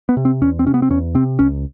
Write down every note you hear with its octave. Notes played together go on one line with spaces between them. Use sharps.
B3
C3
C4
E2 C#4
C4
C3 C#4
B3
C4
E2 C#4
C3 C4
C#2 C#4